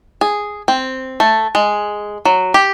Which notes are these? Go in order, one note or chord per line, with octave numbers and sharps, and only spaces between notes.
G#4
C4
A3
G#3
F#3
G4